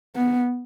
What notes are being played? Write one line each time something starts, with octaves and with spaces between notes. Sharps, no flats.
B3